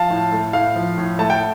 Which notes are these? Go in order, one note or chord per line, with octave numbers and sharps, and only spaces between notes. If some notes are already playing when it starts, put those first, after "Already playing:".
Already playing: F3 F5 A5
A2
A3
A2 F5
F3
A2
A3 A5
G5